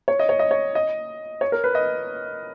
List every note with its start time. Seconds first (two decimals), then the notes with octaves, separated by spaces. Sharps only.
0.08 C#5
0.19 D#5
0.29 C#5
0.39 D#5
0.51 C#5
0.75 D#5
1.41 C#5
1.52 A#4
1.64 B4
1.75 D#5